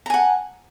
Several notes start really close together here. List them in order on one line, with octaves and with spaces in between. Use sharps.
A#5 G#5 F#5